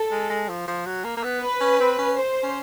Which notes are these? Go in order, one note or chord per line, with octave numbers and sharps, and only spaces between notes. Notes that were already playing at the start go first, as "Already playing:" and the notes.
Already playing: A4
G#3
G#3
F3
F3
F#3
A#3
A#3
B3
B4
C#4
C4
C#4
C5
C#4